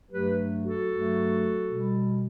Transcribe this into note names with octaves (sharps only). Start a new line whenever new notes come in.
G2 F#3 A3 G4 B4
F#4 A4
G2 F#3 A3
B2 G3